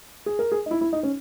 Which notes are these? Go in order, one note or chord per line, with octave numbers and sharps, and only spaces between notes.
G#4
A#4
G#4
D#4
E4
E4
D#4
C#4